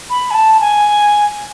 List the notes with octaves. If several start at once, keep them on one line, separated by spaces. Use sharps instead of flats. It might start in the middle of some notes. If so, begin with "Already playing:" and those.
B5
G#5
A5
G#5